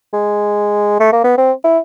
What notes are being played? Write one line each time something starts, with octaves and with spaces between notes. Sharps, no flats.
G#3
A3
A#3
B3
C4
E4